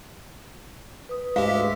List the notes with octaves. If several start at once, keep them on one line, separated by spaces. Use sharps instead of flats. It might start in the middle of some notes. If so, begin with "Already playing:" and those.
B4 D#6
D2 G#2 G#3 G4 E5 F5